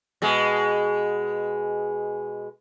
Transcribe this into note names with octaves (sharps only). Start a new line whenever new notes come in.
B2 G#3